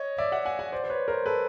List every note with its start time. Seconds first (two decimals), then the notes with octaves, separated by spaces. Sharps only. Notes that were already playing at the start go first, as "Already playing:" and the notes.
Already playing: C#5 D#5
0.18 D5 E5
0.32 E5 F#5
0.45 F#5 G#5
0.59 F#5 G#5
0.72 C5 D5
0.84 C5
0.90 B4 C#5
1.08 A#4 C5
1.26 A4 B4